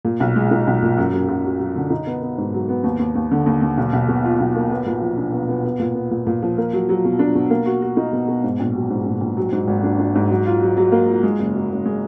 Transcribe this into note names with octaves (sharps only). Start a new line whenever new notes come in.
A#2
B1
G#3
D#4
B1
A#2
F#2
F#2
F#2
F#3
F#3
D3
D#4
B3
B3
G#2
F#3
B3
D#2
D#2
D#2
D3
D#2
D#2
B1
B1
B2
F4
B1
A#3
B3
A#2
F3
D4
B3
B3
B3
A#2
B3
A#2
A#2
F3
A#3
F#3
F#3
B2
D4
B2
A#3
F#4
F#4
D#4
B2
B2
G#2
A#1
F#3
G#2
A#1
A#1
F#3
G#2
G#1
D4
D4
G#2
F#3
F4
F#3
F#3
A#3
F4
G#3
F#1
F#2
F#1
G#3